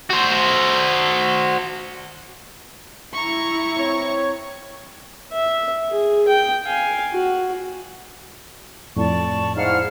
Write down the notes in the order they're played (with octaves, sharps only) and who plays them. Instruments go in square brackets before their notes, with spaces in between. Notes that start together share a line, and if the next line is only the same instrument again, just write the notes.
[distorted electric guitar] F#4 C5
[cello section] E4 [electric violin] A#5 C#6
[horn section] C4 C#5
[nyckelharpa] E5
G#4
G5
F5 G#5
F#4
[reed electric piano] F2 A2 [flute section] D5 A5 C#6
[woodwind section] G#2 E4 F6 [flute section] F5 F#5